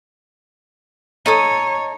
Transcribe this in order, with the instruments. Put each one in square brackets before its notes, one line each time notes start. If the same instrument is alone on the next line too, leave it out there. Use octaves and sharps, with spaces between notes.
[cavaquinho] D#4 A4 D#6 [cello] C#5